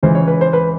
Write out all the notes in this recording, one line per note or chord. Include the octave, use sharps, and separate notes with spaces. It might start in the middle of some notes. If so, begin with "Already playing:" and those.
C#2 C#3 E3 C5
C#5
B4
C5
B4